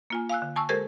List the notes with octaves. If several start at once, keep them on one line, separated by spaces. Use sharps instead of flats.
A#3 F4 G#5
F5 G#5 E6 F#6
D3
G#5 A5 C#6 E6
G#3 G4 A4 A#4 C5 G#6